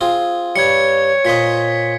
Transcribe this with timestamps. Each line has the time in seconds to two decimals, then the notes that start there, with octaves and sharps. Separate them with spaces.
0.01 C4 F4 G#4
0.56 G2 G3 C#5 G#6 C#7
1.25 A#2 C5 D#5 B6 C#7